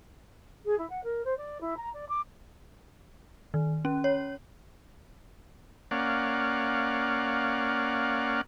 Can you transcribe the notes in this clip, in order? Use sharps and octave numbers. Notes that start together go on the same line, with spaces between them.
G#4
E4
F#5
A#4
C5
D5
E4
A#5
D5
D6
D#3
C#4
C#5
A#3 C#4 D5 F5 F#5